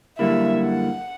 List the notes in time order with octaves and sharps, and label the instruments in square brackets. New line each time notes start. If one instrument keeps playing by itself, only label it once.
[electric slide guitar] F#2 D3 G3 A#3 E4 [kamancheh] E5
[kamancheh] F#5